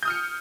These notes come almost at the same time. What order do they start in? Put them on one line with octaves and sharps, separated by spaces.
G6 D#6 F6 C#7